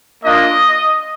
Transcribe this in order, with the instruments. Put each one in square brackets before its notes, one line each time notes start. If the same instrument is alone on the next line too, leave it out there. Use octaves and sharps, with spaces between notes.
[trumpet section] A#3 D4 F4 D#5